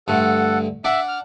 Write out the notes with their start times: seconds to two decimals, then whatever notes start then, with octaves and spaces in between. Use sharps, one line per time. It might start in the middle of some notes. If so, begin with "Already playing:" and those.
0.08 G2 D3 A3 A4 F#5
0.84 D4 D5 E5 F#5
1.08 F6